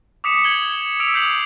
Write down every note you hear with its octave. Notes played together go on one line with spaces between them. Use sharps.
D6 D#6 B6 C#7 E7
G#6 F#7 G7
E6 B6 D7 F7
D#6 G6 C7 F#7